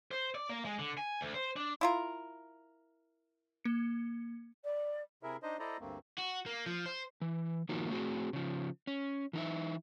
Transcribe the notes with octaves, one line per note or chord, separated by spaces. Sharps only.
C5
D5
A#3
G#3
D3
G#5
D2
C5
D4
E4 F4 A#4
A#3 C#7
D5
C3 E4 G#4 A#4 E5
D4 D#4 C5 D#5
E4 A4 C5 D5 D#5 A#5
D2 G2 A3 A#3 C4
F#4
A#3
F3
C5
E3
D#3 F3 A#3 D#4 E4 F#4
A3 C4 F#4 G#4
C#3 F3
C#4
E3 D#4 E5